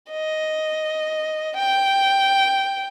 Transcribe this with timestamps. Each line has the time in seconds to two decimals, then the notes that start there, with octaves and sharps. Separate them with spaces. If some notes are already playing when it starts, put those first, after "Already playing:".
0.10 D#5
1.56 G5